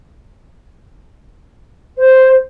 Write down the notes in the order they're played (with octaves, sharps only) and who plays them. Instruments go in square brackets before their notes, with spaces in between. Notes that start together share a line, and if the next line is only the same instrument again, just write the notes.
[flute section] C5